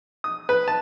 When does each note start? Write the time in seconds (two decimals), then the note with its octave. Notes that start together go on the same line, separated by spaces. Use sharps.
0.24 D#6
0.49 B4
0.68 A5